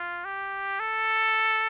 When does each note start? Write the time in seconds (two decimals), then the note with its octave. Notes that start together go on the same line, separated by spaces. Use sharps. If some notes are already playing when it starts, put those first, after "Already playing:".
Already playing: F4
0.25 G4
0.80 A4